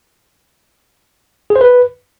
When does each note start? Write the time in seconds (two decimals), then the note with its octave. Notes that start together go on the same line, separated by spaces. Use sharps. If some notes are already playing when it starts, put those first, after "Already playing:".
1.50 G#4
1.56 C5
1.61 B4